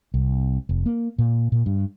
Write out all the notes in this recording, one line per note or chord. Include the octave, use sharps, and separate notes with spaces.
C2
F1
A#3
A#2
A#2
G2